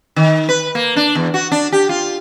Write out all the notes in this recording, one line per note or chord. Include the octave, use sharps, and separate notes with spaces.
D#3
B4
A#3
D4
E2
F#4
D4
G4
F4